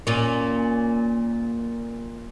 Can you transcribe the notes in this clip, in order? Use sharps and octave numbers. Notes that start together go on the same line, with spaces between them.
A#2 C#4